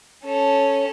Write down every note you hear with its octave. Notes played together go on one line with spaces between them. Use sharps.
C#4 A4